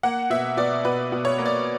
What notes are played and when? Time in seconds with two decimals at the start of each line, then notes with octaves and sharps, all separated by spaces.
0.03 A#3 F#5
0.30 B2 E5
0.57 B2 D5
0.85 B2 B4
1.12 B2
1.25 C#5
1.39 A#3
1.46 D5